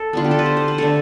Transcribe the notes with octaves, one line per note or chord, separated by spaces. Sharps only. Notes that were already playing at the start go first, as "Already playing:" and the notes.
Already playing: A4
D3 G3 B3 F4
G4
A4
B4
C5
C5
B4
D3 A3 A4